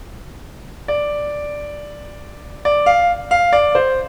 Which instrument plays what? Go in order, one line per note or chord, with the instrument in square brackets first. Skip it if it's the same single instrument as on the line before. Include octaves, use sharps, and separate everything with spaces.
[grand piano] D5
D5
F5
F5
D5
C5